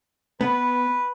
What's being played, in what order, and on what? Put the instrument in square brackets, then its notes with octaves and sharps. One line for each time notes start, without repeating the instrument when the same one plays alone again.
[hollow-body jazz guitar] B3 [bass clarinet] B4